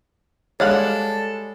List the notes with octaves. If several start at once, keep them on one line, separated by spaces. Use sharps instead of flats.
G3 G#3 D4 A4 C#5 F5 F#5